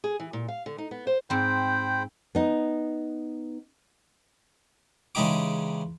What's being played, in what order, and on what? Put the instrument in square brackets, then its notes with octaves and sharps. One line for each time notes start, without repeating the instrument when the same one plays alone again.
[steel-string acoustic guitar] G#4
E3
A#2
F5
D3
D#4
B3
C5
[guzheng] G#2 C4 [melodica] C5 G5 B5
[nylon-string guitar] B3 D#4
[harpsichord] C#3 E3 G#3 D#4 G4 D6